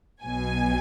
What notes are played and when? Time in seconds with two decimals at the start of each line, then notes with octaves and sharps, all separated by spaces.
0.24 B1 B2 F#3 G#5